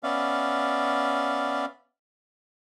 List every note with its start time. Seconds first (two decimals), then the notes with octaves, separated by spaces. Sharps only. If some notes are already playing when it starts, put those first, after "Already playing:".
0.03 B3 C#4 D5 E5 F5